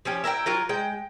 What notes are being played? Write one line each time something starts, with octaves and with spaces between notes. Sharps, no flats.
F3 C#4 G4
E4 A#4 E5 G5
F#3 F4 A#4
G#3 G5